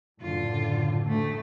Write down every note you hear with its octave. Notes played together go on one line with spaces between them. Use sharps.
F#1 A2 D3 F4
D2 A3